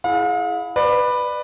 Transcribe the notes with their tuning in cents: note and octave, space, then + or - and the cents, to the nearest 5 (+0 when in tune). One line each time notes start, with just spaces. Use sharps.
E4 +0 G#4 +25 F5 +45
B4 +0 D5 +25